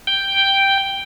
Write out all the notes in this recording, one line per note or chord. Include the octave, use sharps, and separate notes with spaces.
G5